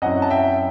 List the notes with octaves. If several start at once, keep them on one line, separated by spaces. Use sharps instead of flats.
F#2 F#3 C4 E4 D#5 F#5
A5
E5 G5